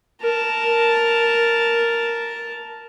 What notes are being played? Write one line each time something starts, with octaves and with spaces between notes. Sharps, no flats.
A#4 A5